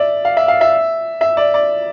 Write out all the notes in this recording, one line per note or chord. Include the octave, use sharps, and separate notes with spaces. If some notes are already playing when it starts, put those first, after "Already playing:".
Already playing: D5 E5
F5
E5
F5
E5
E5
D5
D5